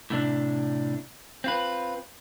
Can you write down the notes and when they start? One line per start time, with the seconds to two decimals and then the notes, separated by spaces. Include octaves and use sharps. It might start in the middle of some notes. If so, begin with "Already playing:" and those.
0.10 A2 C3 D4
1.44 C4 F4 B4